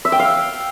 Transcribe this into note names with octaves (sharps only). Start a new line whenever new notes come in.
E5
G5
F5